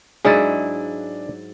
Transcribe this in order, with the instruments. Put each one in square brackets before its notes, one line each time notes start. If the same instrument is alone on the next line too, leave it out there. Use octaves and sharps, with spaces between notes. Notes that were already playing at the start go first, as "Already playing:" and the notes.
[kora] G#2 F#3 E4 [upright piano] D4 A6 D#7 [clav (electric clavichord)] G#4 D#5